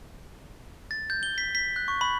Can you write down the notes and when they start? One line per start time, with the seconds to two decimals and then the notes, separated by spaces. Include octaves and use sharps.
0.91 A6
1.10 G6
1.23 G7
1.38 B6
1.55 B6
1.76 F#6
1.88 C#6
2.01 B5